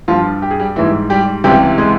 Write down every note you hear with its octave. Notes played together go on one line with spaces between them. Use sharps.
G2 F3 G3 F4
G4
G#4
G3 G4
G#2 E3 G3 E4
G3 G4
C#2 C3 E3 G3 G4
G#3 G#4